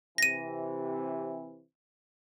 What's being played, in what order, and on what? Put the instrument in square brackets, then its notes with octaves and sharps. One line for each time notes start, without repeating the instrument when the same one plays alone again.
[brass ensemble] C3 E3 [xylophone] A#6 D#7